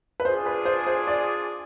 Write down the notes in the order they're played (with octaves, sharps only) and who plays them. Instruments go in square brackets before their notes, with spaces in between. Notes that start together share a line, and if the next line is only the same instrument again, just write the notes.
[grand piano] B4
[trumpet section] D4 F4 G#4 [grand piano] C5
[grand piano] B4
C5
C5
D5